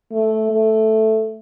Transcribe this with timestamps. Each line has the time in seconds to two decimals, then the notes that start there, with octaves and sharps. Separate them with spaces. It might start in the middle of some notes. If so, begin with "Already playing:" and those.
0.12 A3
0.51 A3